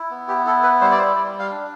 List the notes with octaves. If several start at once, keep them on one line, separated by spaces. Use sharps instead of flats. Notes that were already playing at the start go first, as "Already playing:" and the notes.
Already playing: E4
B3
G4
E4 A4
B4
G3 C5
D5
C5
G3 D5
F5
D4